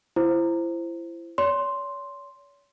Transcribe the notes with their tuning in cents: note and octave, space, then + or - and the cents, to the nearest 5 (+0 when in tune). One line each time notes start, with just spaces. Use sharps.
E4 +30 C5 +0
C#5 +40 C6 +0